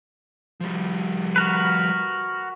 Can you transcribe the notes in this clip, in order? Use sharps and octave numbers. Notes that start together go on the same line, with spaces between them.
F3 G3
F#4 A#4 B4